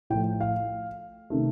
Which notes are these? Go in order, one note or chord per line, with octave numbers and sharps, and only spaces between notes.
A2 F3 A3 G5
F5
C3 D#3 A3